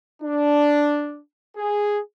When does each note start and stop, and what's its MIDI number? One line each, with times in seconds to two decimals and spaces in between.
0.22 1.19 62
1.56 1.99 68